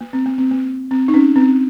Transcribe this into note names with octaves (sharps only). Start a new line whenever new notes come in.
A#3
C4
A#3
C4
A#3
C4
D#4
C#4
C4